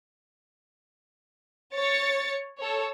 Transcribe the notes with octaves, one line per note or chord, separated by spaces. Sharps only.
C#5 A6 C#7
A4 C#5